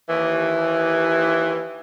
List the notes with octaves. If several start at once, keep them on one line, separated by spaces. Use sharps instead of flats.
D#2 E3